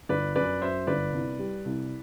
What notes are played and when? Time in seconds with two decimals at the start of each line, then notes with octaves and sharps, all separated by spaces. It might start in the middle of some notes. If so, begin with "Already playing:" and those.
0.09 G1 B4 D5
0.36 F#2 B4 D5
0.62 F#2 C5 E5
0.87 G1 B4 D5
1.13 C2
1.39 G3
1.66 C2